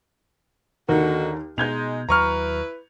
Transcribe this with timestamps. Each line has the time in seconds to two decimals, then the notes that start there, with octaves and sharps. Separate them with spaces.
0.88 D#2 D3 D#4 F#4 A#4
1.58 B2 G#3 D#4 G6 G#6 F7
2.09 D#2 F#3 E4 B4 A#5 C#6 F6